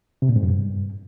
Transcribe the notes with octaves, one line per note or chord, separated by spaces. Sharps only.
C3
A#2
G#2
F#2
G2